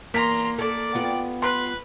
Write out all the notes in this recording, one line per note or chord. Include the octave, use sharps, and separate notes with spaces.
E2 A#3 A#5 C6 B6
A4 D5
B3 F4 G4
B4 C6